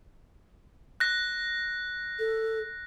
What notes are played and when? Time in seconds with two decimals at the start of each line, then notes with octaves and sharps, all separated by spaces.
1.00 F#6 A#6
2.19 A4